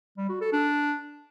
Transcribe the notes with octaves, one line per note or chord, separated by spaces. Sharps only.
G3
F#4
A4
D4